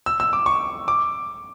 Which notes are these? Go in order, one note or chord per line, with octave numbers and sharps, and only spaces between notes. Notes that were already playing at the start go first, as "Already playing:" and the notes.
E6
E6
D6
C#6
D6